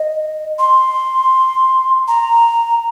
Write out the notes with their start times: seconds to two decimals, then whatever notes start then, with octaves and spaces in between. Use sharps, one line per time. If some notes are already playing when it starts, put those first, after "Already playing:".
Already playing: D#5
0.59 C6
2.08 A#5